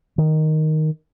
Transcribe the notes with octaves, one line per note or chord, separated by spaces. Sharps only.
D#3